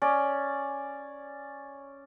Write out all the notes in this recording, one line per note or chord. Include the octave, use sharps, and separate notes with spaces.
C#4 D5